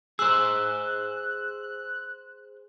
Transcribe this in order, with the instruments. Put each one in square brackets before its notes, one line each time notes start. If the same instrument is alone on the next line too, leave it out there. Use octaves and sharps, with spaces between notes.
[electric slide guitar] G#4 C5 [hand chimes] E6 [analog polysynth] F#6